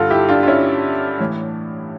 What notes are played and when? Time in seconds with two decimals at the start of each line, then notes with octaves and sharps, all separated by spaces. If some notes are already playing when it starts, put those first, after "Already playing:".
Already playing: G2 D3 F4 A4
0.11 E4 G4
0.29 D4 F4
0.43 F4
0.47 C#4 E4
1.20 A2 E3